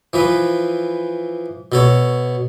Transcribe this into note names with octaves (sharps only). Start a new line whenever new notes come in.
E3 F3 B4
B2 A4 C#5